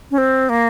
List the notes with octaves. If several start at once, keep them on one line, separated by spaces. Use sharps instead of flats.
C#4
C4
A#3